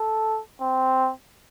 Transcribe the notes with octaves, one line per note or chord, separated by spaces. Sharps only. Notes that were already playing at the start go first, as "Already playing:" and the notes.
Already playing: A4
C4